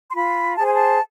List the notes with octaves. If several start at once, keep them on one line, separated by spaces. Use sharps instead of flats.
C6
F4 B5
G#4 C5 A5
G#5
A5